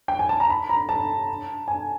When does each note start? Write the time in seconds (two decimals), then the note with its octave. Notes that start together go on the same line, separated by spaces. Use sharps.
0.08 G5
0.19 G#5
0.29 A5
0.40 A#5
0.50 B5
0.69 A#5
0.89 A5
1.68 G#5